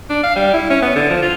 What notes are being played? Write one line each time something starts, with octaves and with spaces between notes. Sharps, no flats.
D4
F5
G3
E4
C#4
B3
D3
F3
F4